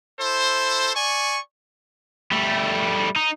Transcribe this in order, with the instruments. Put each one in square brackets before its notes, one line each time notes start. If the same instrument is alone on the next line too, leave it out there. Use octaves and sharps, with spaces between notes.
[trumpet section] E4 A4 C5
D5 G#5 C#6
[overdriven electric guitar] G3 A3
D#4